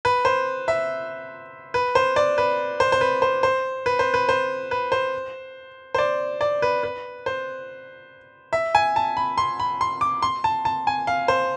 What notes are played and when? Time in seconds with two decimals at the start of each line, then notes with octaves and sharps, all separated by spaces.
0.05 B4
0.25 C5
0.68 E5
1.74 B4
1.95 C5
2.16 D5
2.38 B4
2.80 C5
2.92 C5
3.01 B4
3.22 C5
3.43 C5
3.86 B4
3.99 C5
4.14 B4
4.29 C5
4.71 B4
4.92 C5
5.94 C5
5.98 D5
6.41 D5
6.62 B4
6.83 B4
7.26 C5
8.53 E5
8.75 G#5
8.96 A5
9.17 B5
9.38 C6
9.60 B5
9.81 C6
10.01 D6
10.22 C6
10.44 A5
10.65 A5
10.87 G#5
11.07 F5
11.28 C5